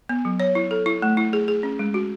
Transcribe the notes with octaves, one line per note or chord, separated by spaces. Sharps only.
B3
F#3
C#5
E4
A4
E4
A3
E4
G#4
G#4
C#4
G#3
F#4